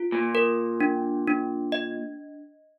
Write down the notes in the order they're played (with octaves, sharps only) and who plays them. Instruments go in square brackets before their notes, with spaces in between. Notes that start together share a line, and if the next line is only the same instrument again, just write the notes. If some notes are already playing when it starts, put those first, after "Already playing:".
Already playing: [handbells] F4
[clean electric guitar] A#2
[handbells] A#4
D4
D4
D#5